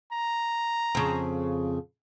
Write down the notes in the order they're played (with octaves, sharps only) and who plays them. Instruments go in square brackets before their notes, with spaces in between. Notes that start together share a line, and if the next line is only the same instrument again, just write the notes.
[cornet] A#5
[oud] F2 C#3